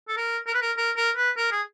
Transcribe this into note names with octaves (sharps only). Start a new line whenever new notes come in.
A4
A#4
A#4
B4
A#4
A#4
A#4
B4
A#4
G#4